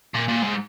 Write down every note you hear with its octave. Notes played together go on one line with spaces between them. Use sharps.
A#2
A#2
G#2